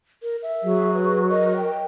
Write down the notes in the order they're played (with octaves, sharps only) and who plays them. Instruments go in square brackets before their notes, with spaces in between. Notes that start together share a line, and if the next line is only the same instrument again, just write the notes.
[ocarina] A#4
E5
[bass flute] F#3 [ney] G#4
[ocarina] B4
[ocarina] A#4 [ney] D#5
[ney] G5